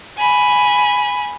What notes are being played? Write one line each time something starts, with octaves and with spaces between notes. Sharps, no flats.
G#5 B5